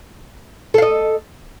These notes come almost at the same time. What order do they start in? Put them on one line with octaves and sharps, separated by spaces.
A4 F5 D#5